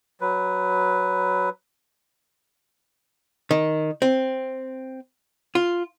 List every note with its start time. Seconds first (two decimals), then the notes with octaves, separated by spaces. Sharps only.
0.21 F#3 B4
3.51 D#3
4.02 C4
5.55 F4